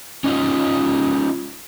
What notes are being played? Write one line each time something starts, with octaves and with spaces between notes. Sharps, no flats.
C#4 D#4 F4 D#5